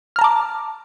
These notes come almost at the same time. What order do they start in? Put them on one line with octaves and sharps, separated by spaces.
F6 A#5 A5 D6